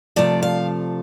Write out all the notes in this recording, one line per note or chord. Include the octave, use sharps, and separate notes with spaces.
C3 F3 A3 D5
F5